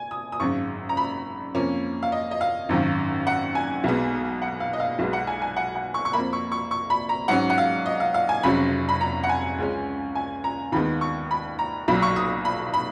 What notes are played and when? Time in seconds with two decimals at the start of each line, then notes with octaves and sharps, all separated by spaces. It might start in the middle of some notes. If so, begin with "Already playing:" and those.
Already playing: G#5
0.11 D#6
0.32 D#6
0.40 G#1 F#2 C#3 C#6
0.89 A#5
0.97 B5
1.55 F2 F3 A#3 C#4
2.03 F5
2.12 D#5
2.31 D#5
2.41 F5
2.69 G#1 F#2 D#3
3.27 F#5
3.55 G#5
3.84 B1 B2 G#3 B3
4.42 F#5
4.60 F5
4.73 D#5
4.80 F5
4.99 B1 B2 G#3 B3
5.13 F#5
5.27 G#5
5.42 G#5
5.56 F#5
5.75 F#5
5.94 C#6
6.05 C#6
6.13 F2 F3 A#3 B5
6.33 C#6
6.52 C#6
6.71 C#6
6.90 B5
7.09 A#5
7.28 G#2 F#3 C#4 F#5
7.50 F#5
7.58 F5
7.86 D#5
8.00 F5
8.14 F5
8.29 G#5
8.43 F1 F2 C#3 F#3 C#4 B5
8.89 B5
9.01 A#5
9.23 F#5
9.29 G#5
9.58 C#2 C#3 G#3 C#4
10.15 G#5
10.44 A#5
10.72 D#2 D#3 G#3 B3 B5
11.01 C#6
11.31 B5
11.59 A#5
11.88 B1 A#2 F#3 B5
12.02 C#6
12.16 D#6
12.45 B5
12.74 B5